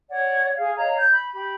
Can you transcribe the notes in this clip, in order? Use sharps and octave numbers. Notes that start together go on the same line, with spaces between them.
C#5 D5 F#5
G#4 F5
C#5 D#5 F5 A#5
G6
B5
G4 B5